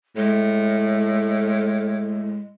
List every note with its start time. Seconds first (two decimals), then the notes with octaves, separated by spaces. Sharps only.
0.16 A2 G#3